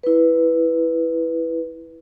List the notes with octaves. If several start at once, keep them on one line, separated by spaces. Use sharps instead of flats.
E4 B4